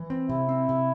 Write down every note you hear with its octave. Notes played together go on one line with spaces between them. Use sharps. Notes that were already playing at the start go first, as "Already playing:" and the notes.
Already playing: E3
C4
C3 E4
C4
C3